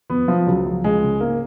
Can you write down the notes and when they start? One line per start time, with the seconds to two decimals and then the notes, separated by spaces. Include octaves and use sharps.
0.10 F2 B3
0.28 F3
0.46 C#2 F#3
0.66 F3
0.84 C#2 G#3
1.03 C#3
1.20 G#2 A#3